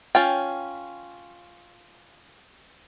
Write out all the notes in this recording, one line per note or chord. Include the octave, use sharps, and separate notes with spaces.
C#4 F4 G5